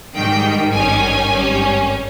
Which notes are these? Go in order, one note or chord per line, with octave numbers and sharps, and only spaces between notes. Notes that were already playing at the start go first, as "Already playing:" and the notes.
G#2 D#3 G3 G5
G#1 G2 D#3 G3 C#4 G#5
G#1 G2 G3 C#4